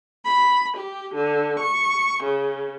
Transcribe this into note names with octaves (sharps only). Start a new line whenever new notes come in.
B5
G4
D3
C#6
C#3